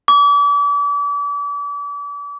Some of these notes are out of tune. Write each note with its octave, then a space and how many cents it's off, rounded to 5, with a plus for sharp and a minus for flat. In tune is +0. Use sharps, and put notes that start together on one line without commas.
D6 -40